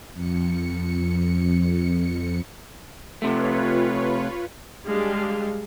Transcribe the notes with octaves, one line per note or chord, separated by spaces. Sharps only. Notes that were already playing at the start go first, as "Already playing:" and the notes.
F2 C#7
C3 A3 F4 B4 C#5
G3 G#3 D4 G4 D#5 F5